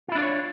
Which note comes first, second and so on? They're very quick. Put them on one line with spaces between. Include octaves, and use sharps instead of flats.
F4 E4 D4 D5 C#5